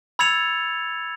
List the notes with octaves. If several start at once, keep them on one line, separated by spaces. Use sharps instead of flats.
B5 E6 G#6 A6 C#7 F7